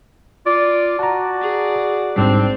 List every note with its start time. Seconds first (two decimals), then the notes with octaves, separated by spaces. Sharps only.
0.46 F4 D5
0.99 F#4 D5 A5 A#5
1.41 G#4
2.17 A1 G#2 G3 C4 D4